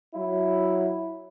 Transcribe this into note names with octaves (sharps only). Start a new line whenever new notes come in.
F#3 E4